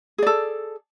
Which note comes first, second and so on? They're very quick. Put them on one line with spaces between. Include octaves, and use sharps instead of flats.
G#4 D5 A4